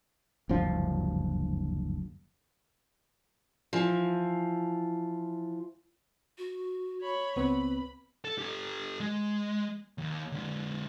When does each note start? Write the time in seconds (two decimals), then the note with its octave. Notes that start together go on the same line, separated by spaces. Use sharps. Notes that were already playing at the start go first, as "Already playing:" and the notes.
0.49 F#1 D2 G2 F3
3.73 E3 F3
6.38 F#4
7.02 C#5 B5
7.36 C#2 B3 C4 B4 B5
8.25 A4
8.39 G4 A4
9.00 G#3
9.98 D#2
10.32 D3 G#3